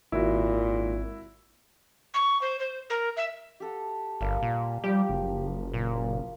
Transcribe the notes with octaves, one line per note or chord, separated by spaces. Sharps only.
G#1 A#2 E4 F#4
C#6
C5
C5
A#4
E5
G4 A4 F#5
G1 G3 A#3 G4
A#2
F3 G3 G4
F#1
A#2